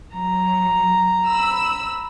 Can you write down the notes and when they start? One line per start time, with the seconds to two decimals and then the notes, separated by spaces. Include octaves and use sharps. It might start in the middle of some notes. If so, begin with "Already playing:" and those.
0.13 F#3 A#5
1.28 B5 E6